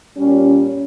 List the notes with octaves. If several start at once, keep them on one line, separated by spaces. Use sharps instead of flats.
A#2 G3 C#4